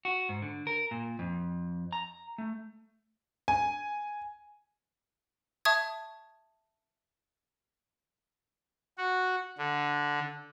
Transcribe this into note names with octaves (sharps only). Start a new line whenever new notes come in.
F#4
G#2
D3
A#4
A#2
F2
A#5
A3
G#5
E5 A5 C#6 D#6 G#6
F#4
D3